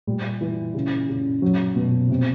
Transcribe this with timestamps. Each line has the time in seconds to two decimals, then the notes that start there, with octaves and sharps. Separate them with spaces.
0.07 A#2 G3
0.41 E3
0.74 C#3
1.08 C#3
1.42 F#3
1.76 B2
2.10 C3